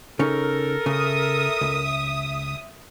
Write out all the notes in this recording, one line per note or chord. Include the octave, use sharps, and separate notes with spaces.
C#3 C#4 D#4 A4 A#4
C#3 E5 D#6
C#2